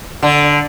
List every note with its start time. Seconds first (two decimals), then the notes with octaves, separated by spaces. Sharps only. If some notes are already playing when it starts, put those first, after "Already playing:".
0.23 D3